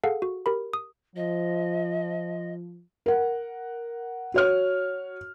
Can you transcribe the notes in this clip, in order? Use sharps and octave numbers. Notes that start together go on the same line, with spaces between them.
G#4 A4 F5 F#5
F#4
G4 A#4 B5
D#6
F3 D#5
A#4 F#5
F#4 C#5 F6